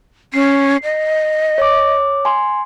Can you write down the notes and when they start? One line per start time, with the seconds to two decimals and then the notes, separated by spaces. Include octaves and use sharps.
0.34 C#4 C7
0.83 D#5
1.58 C#5 D6
2.25 G#5 C6